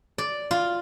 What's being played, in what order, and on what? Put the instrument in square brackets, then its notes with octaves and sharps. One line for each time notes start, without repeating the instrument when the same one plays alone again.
[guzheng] D5
F4